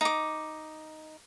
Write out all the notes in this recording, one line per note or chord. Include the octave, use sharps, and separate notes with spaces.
D#4 D6